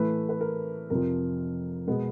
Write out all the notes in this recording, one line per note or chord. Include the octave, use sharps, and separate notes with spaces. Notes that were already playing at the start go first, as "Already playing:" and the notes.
Already playing: A2 E3 A3 B4
B4
A#4
F2 C3 F3 A#4
B2 G#3 B3